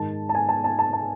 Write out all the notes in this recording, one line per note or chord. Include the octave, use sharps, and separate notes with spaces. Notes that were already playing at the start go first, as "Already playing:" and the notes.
Already playing: G#2 D#3 A5
A5
G#5
A5
A5
A5
A5